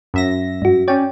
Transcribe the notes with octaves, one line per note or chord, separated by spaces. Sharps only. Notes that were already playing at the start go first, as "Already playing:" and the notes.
F#2 E5 A#6
G2 F#4
C#4 C#5 D5 G5